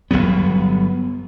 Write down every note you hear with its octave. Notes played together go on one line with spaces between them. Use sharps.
G1 D#2 F#3 B3